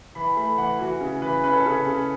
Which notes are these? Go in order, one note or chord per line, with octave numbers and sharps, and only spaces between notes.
E3 B5
A3 B5
E3 F#5
E3 F#4
C#3
E3 B4
C#4 B4
A4
C#3 B4
C#3